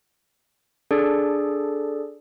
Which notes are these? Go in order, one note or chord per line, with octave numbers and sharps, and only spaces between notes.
D4 G#4 A4 D5